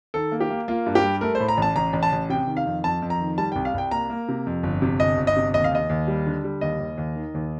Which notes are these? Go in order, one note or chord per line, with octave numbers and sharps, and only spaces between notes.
D#3 A4
A#3
G4
A#3
A#3 F4
G2
G4
G3
A3 A#4
C5
A2
A#5
A1 A5
A1 A#5
A1
A5
A1
C3 G5
D#3
F5
F2
F2 A5
F2
A#5
D#3
G3 A5
C2 G5
F5
C2 G5
A#3 A#5
A#3
C3
F2
G1
C3
G1 D#5
G1
D#5
C3
D#2 D#5
F5
D#2 D#5
D#2
G3
D3
G3
D#2 D#5
D#2
D#2
D#3
D#2